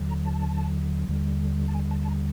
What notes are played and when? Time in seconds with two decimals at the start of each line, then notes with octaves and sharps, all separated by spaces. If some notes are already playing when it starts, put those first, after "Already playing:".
Already playing: D#2 D3 F#3
0.09 A#5
0.25 A5
1.08 D#2 D3 G3
1.68 A5
1.75 G#5
1.91 A5
2.03 A5
2.08 A#5